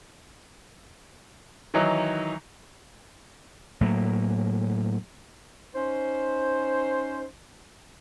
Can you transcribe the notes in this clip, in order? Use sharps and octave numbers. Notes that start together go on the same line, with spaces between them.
D#3 E3 F#3 D#4
A2 F#3 A#3
C#4 D#4 C5